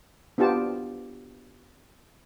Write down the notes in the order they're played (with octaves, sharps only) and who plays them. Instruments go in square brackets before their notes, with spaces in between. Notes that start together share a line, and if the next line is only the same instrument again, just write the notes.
[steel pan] B3 D4 F4 G4 A5